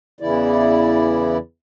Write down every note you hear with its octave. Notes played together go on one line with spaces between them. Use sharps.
E2 C#3 E3 E4 D5